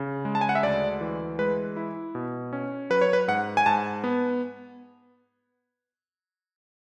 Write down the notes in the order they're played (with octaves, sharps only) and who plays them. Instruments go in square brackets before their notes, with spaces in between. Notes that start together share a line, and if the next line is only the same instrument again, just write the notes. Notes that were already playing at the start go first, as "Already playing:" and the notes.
Already playing: [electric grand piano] C#3
G#3
A5
G#5
F#5
E5
D2 D5
E3
G#3 B4
E4
B2
C#4
F#3 B4
C#5
B4
G#2 F#5
G#5
G#2 A5
B3